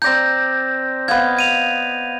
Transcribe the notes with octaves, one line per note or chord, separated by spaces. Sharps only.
C4 D5 A#5 G6 A#6
B3 D#5 F5 G#6
G#6 D#7 F7